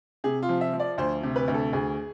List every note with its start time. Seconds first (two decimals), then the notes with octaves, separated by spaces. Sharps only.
0.24 C3 G#4
0.43 F4
0.49 F3
0.61 E5
0.73 F3
0.80 D5
0.98 D2 C5
1.23 C3
1.36 B4
1.48 D2
1.54 A4
1.73 D2 G#4